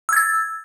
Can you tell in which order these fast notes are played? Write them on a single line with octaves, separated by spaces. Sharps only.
E6 G#6 A6